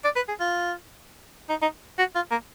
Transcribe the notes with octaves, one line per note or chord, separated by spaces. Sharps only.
D5
B4
G#4
F4
D#4
D#4
F#4
F4
A#3